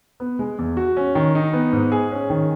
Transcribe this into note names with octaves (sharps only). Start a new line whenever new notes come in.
B3
G#3
E2
F#4
C#4
D#3
D#4
B3
G#2
G#4
C#4
D#3